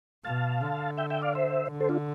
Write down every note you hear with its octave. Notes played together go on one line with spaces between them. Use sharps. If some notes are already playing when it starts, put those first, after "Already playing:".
B2 F5 A5
D3
E5 G5
E5 G5
D5 F5
C5 E5
D3
A4 C5
D4 F4